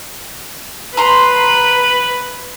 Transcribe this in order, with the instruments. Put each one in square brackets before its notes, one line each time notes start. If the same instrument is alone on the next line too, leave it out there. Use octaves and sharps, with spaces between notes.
[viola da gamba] B4 [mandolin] A#5 C6